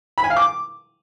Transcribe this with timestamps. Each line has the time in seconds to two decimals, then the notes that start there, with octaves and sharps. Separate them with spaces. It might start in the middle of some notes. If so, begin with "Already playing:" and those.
0.18 B5
0.24 G#5
0.30 F5
0.37 D6